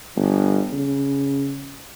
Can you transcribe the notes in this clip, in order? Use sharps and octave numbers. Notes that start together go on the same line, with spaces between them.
G1
C#3